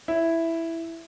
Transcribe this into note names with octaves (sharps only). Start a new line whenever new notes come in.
E4